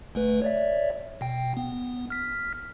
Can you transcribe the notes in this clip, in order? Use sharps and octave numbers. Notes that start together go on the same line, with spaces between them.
G1 A3 B4
C#5 D5 E5
B2 G5
B3
F6 B6